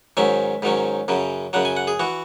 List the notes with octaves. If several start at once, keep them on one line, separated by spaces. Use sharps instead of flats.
G#2 D#3 F#3 C#4 E5
G#2 D#3 F#3 C#4
F#2 C#3 F#3
F#2 C#3 F#3 F#5
G#5
F#5
G#4
E3 F#4